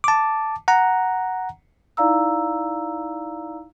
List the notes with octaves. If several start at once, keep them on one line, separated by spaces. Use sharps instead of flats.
A5 D6
F#5 A#5
D#4 E4 D5 F5 A#5 E6